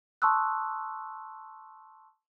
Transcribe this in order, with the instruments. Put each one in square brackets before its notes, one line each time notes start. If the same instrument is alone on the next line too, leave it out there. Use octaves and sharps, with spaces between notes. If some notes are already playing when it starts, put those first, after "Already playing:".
[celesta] A5 C6 C#6 D#6 E6 F#6